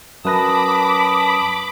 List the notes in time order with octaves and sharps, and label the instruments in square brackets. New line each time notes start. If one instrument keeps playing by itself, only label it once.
[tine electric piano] F#2 B4 A#6 [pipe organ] A5 D#6 [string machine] B5 D6